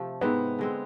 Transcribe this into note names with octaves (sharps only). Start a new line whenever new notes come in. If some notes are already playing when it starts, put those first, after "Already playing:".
Already playing: C3 F3 A3
G#2 G#3 B3 C4 E4
D3 G#3 C4